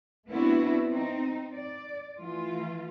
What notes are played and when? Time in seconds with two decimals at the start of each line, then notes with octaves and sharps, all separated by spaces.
0.28 A3 B3 C4 D4 E4 F#4
0.90 C4 D#4
1.53 D5
2.18 E3 A3 F4